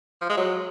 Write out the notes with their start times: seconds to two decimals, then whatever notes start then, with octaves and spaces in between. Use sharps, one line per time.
0.21 F3
0.29 G#3
0.37 F#3